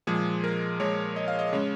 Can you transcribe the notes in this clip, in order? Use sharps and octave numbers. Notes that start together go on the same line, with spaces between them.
A#2 F3 G#3 G#4
A#4
A#2 F3 G#3 C#5
D#5
F5
D#5
C#3 G#3 C#5